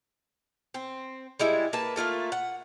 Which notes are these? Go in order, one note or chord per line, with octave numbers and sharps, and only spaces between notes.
C4
G3 G#3 E4
A#3 B4 A5
A3 A#3 F4 A4
F#5